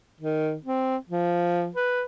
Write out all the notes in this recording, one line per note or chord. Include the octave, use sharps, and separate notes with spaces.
D#3
C4
F3
B4